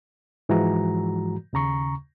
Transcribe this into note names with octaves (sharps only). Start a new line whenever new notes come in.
G#2 E3 F3 G#3 F#4 A#5
D#2 C#3 A#5 C#6